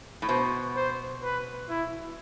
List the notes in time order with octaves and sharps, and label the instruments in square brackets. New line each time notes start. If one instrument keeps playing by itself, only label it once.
[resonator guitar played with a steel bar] A2
[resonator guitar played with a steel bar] B2 [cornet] C5
[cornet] C5
B4
E4